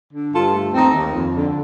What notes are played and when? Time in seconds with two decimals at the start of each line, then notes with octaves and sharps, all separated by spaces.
0.13 D3
0.33 G2 F4 A4
0.53 A3
0.74 D#2 C4 D#4
0.94 D#2
1.14 F2
1.35 D3